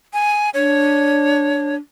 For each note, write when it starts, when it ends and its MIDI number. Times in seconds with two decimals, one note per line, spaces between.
0.13 0.50 80
0.54 1.77 62
0.54 1.75 73